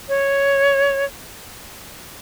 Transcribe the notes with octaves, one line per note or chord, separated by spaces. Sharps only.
C#5